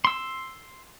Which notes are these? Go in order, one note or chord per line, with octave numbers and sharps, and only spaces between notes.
C6 E6